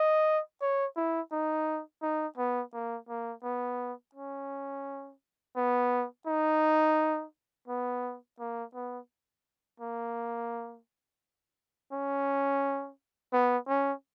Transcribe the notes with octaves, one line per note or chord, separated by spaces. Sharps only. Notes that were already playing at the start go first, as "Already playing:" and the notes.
Already playing: D#5
C#5
E4
D#4
D#4
B3
A#3
A#3
B3
C#4
B3
D#4
B3
A#3
B3
A#3
C#4
B3
C#4